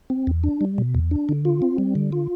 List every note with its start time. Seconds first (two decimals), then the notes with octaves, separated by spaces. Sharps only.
0.10 C4
0.27 E2
0.44 D4
0.61 G3
0.78 B2
0.95 E2
1.11 D4
1.29 D3
1.45 F4
1.62 C4
1.78 G3
1.95 D3
2.12 F4